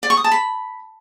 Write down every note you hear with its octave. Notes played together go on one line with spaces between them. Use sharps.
D5
C#6
D#6
A5
B5